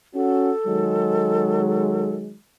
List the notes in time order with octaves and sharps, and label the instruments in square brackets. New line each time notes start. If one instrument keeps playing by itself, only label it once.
[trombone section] C#4 F#4 [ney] A4
[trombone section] D#3 F#3 G#3